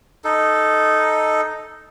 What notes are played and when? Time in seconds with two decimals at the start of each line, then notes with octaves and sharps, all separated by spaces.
0.24 D#4 A4